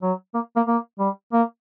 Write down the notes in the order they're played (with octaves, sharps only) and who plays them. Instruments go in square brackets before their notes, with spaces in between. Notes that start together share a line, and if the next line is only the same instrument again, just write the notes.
[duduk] F#3
A#3
A#3
A#3
G3
A#3